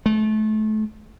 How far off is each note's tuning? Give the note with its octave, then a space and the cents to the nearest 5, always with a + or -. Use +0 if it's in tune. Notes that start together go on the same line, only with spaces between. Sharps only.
A3 -30